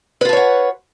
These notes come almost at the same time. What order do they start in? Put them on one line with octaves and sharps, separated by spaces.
B4 F4 A5 C#5 F#5